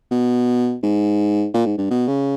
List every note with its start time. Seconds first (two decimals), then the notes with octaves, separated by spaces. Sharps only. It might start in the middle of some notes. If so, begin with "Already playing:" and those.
0.11 B2
0.83 G#2
1.54 A#2
1.66 G#2
1.78 G2
1.91 B2
2.08 C#3